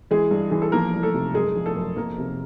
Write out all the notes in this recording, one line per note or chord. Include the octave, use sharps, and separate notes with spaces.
E3 G#3 G#4
G2
E3 G#4
A4
F3 A#3 A#4
C2
A3 A4
C3
F#2 G#3 G#4
F3
A3 A4
F#2
F2 A#3 A#4
C3